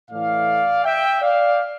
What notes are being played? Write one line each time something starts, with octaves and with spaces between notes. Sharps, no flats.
A2 E3 A3 D5 F5
E5 G5
D5 F5